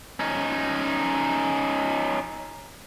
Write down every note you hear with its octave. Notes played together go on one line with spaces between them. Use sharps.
C#4 D#4